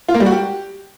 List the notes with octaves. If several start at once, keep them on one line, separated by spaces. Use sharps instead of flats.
F4
A#3
G3
F#4
G4